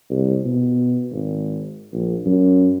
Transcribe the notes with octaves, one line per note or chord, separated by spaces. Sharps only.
C2
B2
G#1
A#1
F#2